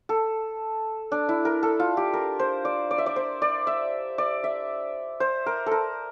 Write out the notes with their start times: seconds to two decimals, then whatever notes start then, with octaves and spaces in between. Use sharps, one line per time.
0.09 A4
1.12 D4
1.29 E4
1.45 A#4
1.63 A4
1.80 F4
1.97 G4
2.13 A#4
2.39 C5
2.65 D5
2.91 D5
2.98 E5
3.06 D5
3.16 C5
3.42 D5
3.67 E5
4.18 D5
4.44 E5
5.20 C5
5.46 A#4
5.66 A4
5.71 A#4